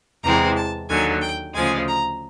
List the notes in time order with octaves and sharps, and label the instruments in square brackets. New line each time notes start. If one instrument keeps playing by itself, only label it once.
[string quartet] E2 C3 E3 G#3 C4 A#5
A5
D#2 D3 F#3 G#5
G5
D2 C#3 F3 G#3 G#5
A#5